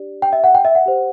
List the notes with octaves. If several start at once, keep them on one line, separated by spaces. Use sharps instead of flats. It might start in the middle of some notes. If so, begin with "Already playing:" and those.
Already playing: D4 G4 D5
G5
E5
F#5
G5
E5
F#5
G4 C5